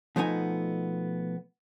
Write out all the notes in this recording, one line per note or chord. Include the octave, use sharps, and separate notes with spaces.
B2 F3 A3 B3 D#4 G#5